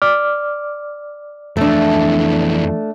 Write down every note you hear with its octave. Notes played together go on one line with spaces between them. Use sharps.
D5 D6 F6
F2 E3 A3 D4